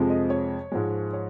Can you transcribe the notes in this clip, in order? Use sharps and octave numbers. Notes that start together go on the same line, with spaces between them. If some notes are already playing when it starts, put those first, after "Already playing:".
Already playing: F2 C3 F3 G#3
D#5
C#5
G#2 F3 G#3
C#5